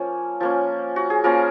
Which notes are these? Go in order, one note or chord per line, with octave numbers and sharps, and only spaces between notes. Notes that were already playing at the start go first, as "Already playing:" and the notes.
Already playing: F3 A#3 C#4
F3 A#3 C#4
F#4
G#4
F3 A#3 C#4 A#4